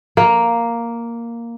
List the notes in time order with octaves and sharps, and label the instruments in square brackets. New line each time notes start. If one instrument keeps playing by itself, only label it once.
[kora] A#3